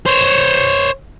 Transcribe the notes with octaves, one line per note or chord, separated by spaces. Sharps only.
C5 C#5